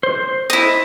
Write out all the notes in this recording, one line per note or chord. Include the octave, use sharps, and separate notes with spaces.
C5
E4 D#5